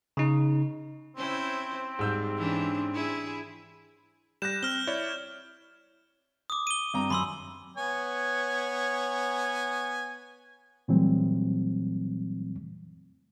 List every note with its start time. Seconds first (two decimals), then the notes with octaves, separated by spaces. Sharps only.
0.17 C#3 D#4
1.17 C4 C#4 E4 C5
1.99 G#2 G3 E6 G6
2.37 E3 C#4 D4
2.94 E4 G#4
4.42 G3 F#6 G6 A#6 E7
4.63 C4 F6 G7
4.87 E4 C#5 D5
6.50 D6 D#6
6.67 D#7 G7
6.94 G2 C4 A#5
7.10 F#2 B5 C6 E6
7.76 B3 C#5 G#5
10.88 A#2 E3 F#3 G3 A3 C4